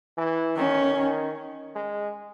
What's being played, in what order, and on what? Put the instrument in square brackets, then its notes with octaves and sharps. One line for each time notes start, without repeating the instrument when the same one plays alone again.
[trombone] E3
[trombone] D#3 [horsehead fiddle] C#4
[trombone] D#3
G#3